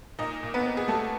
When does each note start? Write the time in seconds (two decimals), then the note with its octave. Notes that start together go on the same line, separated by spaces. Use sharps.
0.19 A#2 D#4 D#5
0.43 A#2
0.54 B3 B4
0.65 C4
0.77 G#4
0.88 G3 A3 A4